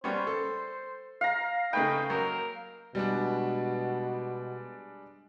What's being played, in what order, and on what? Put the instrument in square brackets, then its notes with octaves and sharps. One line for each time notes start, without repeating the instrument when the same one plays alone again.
[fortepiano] G3 B3 C#4 [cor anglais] C5
[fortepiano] A4
[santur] F5 A#5
[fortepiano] C#3 A3 B4 [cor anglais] D#4 [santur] G5
[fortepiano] F#3 A#3 [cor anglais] A#4
[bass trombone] B2 [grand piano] G3 G#3 D4